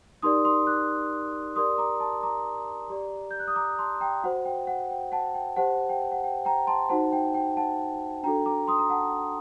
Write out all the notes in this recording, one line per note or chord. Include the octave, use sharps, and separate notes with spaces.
D#4 G4 A#4 D5 C6 D#6
C6 D#6
D6 F#6
G4 A#4 D5 C6 D#6
A#5 D6
A5 C6
A#5 D6
G4 D5
G6
F#6
D#6
A#5 D6
A5 C6
G5 A#5
F#4 C5 F#5
G5
F#5
G5
F#5 A5
G5
G4 C5 F#5 A5
G5
F#5
G5
G5 A#5
A5 C6
D#4 F#4 C5 F#5 A5
G5
G5
F#5 A5
D4 F#4 A4 G5 A#5
A#5 D6
C6 D#6
A#5
F#5 A5